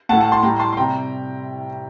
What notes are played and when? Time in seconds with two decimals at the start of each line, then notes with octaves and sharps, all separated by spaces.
0.09 A2 F#5 A5
0.13 A3
0.20 F#5 A5
0.32 A5 C6
0.43 A2 G3 G5 A#5
0.60 A5 C6
0.73 C6
0.77 C3 G3 G5 A#5